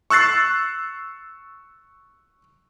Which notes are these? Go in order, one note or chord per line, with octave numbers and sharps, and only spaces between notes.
C#6 E6 F#6 A6 C7